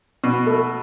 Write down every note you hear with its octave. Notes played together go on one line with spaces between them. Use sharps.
B2
A3